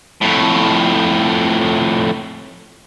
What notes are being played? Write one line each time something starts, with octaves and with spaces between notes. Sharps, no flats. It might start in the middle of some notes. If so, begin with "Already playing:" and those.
F2 A2